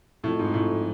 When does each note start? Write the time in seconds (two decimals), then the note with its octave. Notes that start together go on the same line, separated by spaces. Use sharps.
0.24 F2 A2
0.39 G#2
0.54 A2